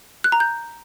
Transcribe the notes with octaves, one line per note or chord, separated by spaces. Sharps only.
F#6
A#5
G6